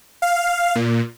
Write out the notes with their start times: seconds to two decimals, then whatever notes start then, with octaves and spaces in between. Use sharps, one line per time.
0.22 F5
0.75 A#2